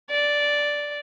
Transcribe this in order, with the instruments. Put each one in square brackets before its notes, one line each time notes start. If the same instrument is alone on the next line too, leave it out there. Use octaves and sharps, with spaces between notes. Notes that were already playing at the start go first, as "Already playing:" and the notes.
[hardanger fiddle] D5